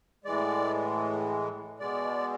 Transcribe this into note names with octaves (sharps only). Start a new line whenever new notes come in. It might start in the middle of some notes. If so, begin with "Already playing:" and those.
A2 E3 G#3 D5
B2 G#3 D5